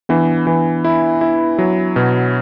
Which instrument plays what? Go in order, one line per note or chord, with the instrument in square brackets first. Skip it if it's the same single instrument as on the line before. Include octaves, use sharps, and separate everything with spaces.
[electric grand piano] E3 [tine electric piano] B3 D4
[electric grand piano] E3
E4
E4
F#3
B2